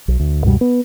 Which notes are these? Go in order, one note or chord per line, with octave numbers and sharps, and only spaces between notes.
B1
D2
C#2 F#2 B2 G3
B3